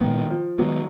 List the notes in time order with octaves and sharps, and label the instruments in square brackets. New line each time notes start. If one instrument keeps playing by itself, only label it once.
[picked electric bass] A#2 G#3 B3 [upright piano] D#3
[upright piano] F3
[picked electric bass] D#3 G#3 B3 [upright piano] F#3